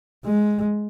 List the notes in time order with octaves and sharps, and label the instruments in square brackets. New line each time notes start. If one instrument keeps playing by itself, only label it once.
[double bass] G#3